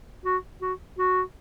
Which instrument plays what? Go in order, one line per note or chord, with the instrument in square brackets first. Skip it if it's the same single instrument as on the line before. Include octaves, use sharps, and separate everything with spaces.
[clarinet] F#4
F#4
F#4